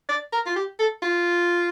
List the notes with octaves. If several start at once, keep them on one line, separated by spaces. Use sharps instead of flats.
D5
A#4
F4
G4
A4
F4